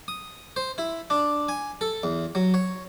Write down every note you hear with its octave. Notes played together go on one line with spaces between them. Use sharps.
D#6
C5
E4
D4
G#5
A4
E2
F#3
C#5